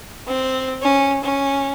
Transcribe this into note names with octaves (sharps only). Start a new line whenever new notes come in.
C4
C#4
C#4